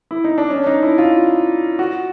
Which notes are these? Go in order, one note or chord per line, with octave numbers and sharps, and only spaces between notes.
E4
D#4
D4
C#4
D4
D#4
E4
F4
F#4